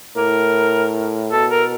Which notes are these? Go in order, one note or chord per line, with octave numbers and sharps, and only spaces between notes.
A2 A#4
B2 A4
A#4